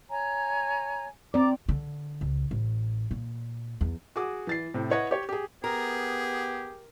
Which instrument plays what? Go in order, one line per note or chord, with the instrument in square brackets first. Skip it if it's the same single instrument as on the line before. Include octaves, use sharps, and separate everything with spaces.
[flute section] C#5 G#5 A#5
[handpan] C4 D5 [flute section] A#5 D6
[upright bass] D3
C#2
A1
A#2
E2
[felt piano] F#4 G#4 D6 D#6
E3 A6 C7
A2 C3
E4 B4 C#5 D#5 F#5
G4 C#5
G4 G#4
[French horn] B3 [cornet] G4 [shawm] G#4 [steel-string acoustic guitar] A#4